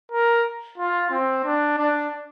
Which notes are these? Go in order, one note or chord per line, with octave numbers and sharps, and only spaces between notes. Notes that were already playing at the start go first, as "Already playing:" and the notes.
A#4
F4
C4
D4
D4